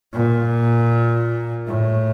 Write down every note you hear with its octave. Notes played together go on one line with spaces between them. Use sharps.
A#2
A2